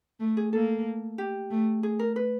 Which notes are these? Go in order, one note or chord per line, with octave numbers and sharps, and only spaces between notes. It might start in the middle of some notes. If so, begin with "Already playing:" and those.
A3
G#4
A#3 A4
G4
A3
G#4
A#4
B4